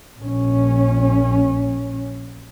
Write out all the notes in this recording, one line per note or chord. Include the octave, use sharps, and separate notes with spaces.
A#1 C#4